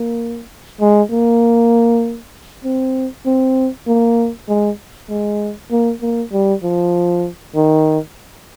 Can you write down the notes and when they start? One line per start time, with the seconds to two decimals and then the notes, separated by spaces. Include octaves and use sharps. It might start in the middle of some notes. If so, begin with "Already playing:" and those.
Already playing: A#3
0.81 G#3
1.11 A#3
2.64 C4
3.26 C4
3.87 A#3
4.49 G#3
5.10 G#3
5.71 A#3
6.02 A#3
6.33 G3
6.63 F3
7.56 D#3